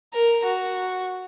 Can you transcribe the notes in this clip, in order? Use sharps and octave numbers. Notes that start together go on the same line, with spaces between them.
A#4
F#4